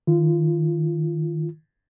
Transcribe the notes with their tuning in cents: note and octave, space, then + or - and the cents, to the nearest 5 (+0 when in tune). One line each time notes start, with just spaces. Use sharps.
D#3 +0 F4 -25